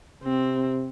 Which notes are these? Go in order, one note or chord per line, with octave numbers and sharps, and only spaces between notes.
C3 C4